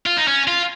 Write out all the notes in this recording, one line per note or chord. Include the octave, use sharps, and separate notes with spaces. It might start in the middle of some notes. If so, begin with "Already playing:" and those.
F4
D#4
C#4
F4